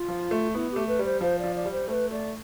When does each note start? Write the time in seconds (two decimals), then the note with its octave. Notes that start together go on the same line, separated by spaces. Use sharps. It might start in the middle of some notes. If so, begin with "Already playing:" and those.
Already playing: F4
0.08 F3
0.31 A3
0.54 B3 E4
0.71 G4
0.76 A3
0.87 B4
0.99 G3
1.05 C5
1.21 F3 C5
1.38 D5
1.44 F3
1.55 D5
1.65 G3
1.72 C5
1.88 A3 C5
1.92 B4
2.10 A3 D5